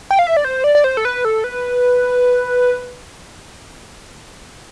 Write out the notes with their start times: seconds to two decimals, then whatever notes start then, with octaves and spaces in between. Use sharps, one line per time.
0.11 G5
0.19 F5
0.27 E5
0.37 D5
0.45 C5
0.64 D5
0.75 D5
0.84 C5
0.97 A4
1.05 B4
1.25 A4
1.44 B4